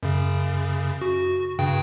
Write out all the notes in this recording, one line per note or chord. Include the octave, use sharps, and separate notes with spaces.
F#2 C#3
F#4
G2 C#3 G5